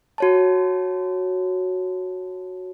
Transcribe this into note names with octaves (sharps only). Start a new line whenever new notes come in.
F#4 C#5 A5